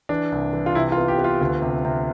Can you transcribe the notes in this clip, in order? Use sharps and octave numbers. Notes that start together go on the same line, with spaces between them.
E3 D4
C2
E3
F4
C3 E4
F4
B3
G4
B3
F4
D2
C3
C3